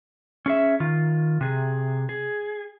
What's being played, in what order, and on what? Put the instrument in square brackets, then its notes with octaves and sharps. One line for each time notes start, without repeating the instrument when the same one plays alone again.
[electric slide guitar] C#4 G#4 E5
D#3 F4
C3 G#4
G#4